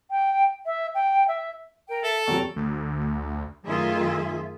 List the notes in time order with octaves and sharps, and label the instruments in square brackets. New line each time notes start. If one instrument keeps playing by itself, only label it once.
[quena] G5
E5
G5
E5
[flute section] A#4 G5
[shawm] A4 [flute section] E5
[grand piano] E2 C3 F#3 [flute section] G5 A#5 C#6
[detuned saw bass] D2
[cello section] F#2 D#3 A3 F4 G#4 E5